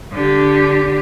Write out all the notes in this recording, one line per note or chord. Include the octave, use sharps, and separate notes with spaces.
D3 G4